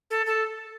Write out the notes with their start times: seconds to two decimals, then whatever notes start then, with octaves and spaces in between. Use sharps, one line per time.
0.10 A4
0.26 A4